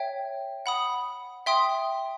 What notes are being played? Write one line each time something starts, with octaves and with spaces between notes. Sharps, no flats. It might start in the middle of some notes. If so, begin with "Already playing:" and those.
Already playing: C#5 E5 G5
F#5 B5 D#6
E5 G5 C6 D#6